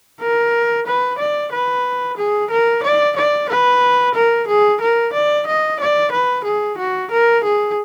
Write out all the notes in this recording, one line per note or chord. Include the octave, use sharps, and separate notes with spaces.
A#4
B4
D5
B4
G#4
A#4
D5
D5
B4
A#4
G#4
A#4
D5
D#5
D5
B4
G#4
F#4
A#4
G#4